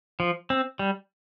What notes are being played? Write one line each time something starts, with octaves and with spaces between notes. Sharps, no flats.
F3
C4
G3